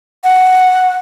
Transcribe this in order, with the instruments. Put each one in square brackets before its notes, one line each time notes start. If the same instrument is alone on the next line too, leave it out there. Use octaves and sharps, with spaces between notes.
[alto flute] F#5